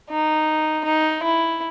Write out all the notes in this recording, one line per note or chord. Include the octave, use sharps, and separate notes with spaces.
D#4
D#4
E4